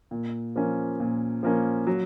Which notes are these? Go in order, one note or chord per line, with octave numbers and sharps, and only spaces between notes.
A#2
F3 A#3 C#4
A#2
F3 A#3 C#4
F#3